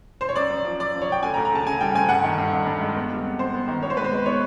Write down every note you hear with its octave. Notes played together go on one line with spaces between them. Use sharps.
C5
C#5
F#2 D5
F#2
F3
F#2 D5
F3
C#5
F#2 G5
D2 G#5
A#5
D2
A#5
C#3 A5
C#3 G#5
G3 G5
D2 G#5
G2 F#5
D#3
G2
G2
G2
G#3
B3
G3
C3
C3 C5
B3
D#3
B3 C#5
C5
G#3 B4
C5
G#3
B3 C#5